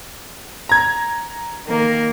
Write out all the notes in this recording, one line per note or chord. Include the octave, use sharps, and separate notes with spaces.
A#5 G#6
D#3 A#3